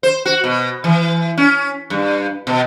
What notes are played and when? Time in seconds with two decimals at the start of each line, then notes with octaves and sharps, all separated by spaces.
0.03 C5
0.26 F#4
0.44 B2
0.84 E3
1.37 C#4
1.90 G2
2.47 B2